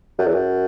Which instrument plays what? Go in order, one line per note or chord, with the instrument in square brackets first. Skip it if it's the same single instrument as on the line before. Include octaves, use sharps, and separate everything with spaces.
[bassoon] F#2
E2
F#2